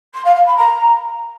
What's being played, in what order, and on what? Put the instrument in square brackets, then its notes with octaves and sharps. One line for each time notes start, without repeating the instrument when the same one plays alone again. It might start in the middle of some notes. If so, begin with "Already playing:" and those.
[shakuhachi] C6
F5
F5
B5
A#5